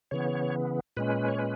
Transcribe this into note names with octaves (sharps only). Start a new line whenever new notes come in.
C#3 E3 B3 C#5
A#2 G#3 C#4 B4
C#5
B4